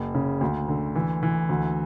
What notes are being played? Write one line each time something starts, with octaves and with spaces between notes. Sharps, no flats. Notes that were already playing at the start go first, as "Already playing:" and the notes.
Already playing: F#1
C#3
D2
D3
E3
E3
D2